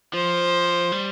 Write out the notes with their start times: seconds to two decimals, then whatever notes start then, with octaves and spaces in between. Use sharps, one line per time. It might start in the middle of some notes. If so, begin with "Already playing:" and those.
0.13 F3 C5
0.92 G3